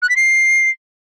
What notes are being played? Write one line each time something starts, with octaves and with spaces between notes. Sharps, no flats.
F#6
B6
C7